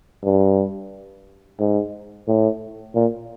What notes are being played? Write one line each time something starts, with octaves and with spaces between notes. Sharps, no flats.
G2
G#2
A2
A#2